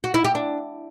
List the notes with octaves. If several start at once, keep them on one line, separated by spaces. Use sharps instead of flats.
F#4
E4
G4
D4